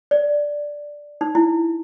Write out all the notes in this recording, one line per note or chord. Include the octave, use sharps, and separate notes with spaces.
D5
D#4
E4